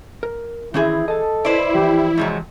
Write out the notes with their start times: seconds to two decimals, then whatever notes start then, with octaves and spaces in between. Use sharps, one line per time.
0.23 A#4
0.74 D#3 E3 C4 C#4 E4 G#4
1.08 A4 D#5 A5
1.45 E4 B4 C5 D5
1.75 E3 F3 G4
2.18 F2 C3 F#3 G#3